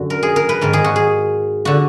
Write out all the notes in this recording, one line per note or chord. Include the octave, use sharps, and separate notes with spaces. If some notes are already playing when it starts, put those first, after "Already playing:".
Already playing: F#2 D3 F#4
A#4
G#4
A#4
B4
G#2 D#3 A#4
G#4
F#4
G#4
D3 F#4